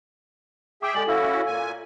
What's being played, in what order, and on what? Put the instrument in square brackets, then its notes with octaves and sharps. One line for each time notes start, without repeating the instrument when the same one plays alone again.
[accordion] G#4 E5 G5 [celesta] D6
[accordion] G#3 G4 D5 [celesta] A4 G#5 F#7
[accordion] C#4 E4 F#4 [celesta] A4 F5 E6
[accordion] A#2 G#5